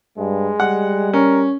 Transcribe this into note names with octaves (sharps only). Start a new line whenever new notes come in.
G2 G#3
G3 F#5
C#4 A#4